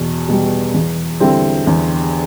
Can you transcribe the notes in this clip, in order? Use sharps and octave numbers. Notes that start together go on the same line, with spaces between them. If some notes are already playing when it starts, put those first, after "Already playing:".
Already playing: E2 B2
B2 G3
E2
D3 G3 C4 E4
E2